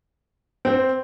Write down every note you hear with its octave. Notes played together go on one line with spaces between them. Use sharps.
C4